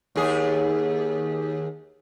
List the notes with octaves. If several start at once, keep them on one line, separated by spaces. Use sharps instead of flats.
D#2 G#4